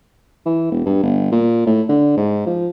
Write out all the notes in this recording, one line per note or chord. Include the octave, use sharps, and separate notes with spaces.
E3
E1
G2
G1
A#2
A2
D3
G#2
F3